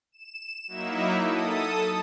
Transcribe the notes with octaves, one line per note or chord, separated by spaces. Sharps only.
E7
F#3 A#3 D#4 E4 E5
A4 D#6